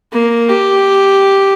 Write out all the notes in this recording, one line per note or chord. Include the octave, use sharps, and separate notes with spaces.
A#3
G4